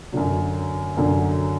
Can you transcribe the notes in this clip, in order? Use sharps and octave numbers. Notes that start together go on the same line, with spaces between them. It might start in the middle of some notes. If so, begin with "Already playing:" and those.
F#2 D3 F#3
F#2 D3 F#3